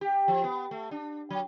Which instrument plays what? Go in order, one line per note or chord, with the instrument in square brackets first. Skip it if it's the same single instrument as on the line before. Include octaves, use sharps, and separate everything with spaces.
[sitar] G4
F3
B3
A3
D4
F#3